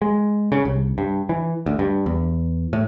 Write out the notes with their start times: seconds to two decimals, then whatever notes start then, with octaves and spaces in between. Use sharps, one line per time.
0.02 G#3
0.52 C#3
0.65 C2
0.98 G2
1.29 E3
1.66 D2
1.79 G2
2.06 E2
2.73 A2